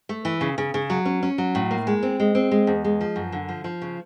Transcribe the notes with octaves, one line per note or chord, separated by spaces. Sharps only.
A3
E3
C#3
C#3
C#3
F#3
C#4
C#4
F#3
A2
A#3
G#3
C4
G#3
C4
G#3
E2
G#3
F3
F#2
D3
F3
F3
C#3